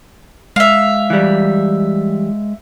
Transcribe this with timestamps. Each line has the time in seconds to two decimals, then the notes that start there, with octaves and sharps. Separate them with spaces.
0.56 G#3 E5 F5
1.10 E3 G3